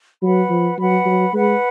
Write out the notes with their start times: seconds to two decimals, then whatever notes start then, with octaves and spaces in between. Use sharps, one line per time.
0.22 F#3 B4 F#5 B5
0.50 F3
0.78 F#3 B4 F#5 B5
1.06 F#3
1.34 G#3 B4 F#5 B5